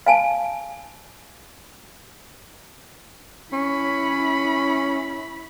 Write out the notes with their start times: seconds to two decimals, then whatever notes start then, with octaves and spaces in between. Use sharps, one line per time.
0.06 F5 G#5 A5
3.53 C#4 E4 B5